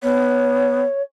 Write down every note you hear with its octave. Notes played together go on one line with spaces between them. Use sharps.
B3 C#5